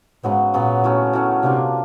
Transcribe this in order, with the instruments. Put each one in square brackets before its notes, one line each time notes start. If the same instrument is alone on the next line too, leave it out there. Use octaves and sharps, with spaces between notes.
[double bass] G#2 [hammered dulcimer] C#3 F#3 B3
[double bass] A#2 [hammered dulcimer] C#3 F#3 B3
[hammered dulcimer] A2 F#3 A3 C#4
A2 F#3 A3 C#4
[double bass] C3 [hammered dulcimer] A#3 D4 F4